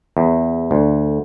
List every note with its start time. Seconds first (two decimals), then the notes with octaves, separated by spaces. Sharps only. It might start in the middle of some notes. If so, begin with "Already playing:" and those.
0.17 E2
0.71 D2